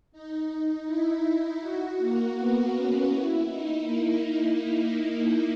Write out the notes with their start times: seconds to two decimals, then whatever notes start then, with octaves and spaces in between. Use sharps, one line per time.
0.12 D#4
0.86 E4
1.23 E4
1.61 F#4
1.98 A#3
2.35 B3
2.72 C#4
3.09 E4
3.47 D#4
3.84 A#3